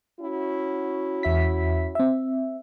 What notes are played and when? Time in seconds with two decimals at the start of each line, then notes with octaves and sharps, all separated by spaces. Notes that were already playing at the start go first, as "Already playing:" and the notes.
0.21 C#4 E4 F#4
1.23 E2 E5 B6
1.95 C4 E5